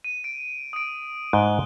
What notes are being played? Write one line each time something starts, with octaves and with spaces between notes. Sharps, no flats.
D#7
D7
D#6 D7
G#2 F#6 D7 G7